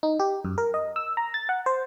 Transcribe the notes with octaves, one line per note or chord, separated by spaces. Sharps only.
D#4
G4
F#2
A#4
D#5
E6
A#5
A6
F#5
C5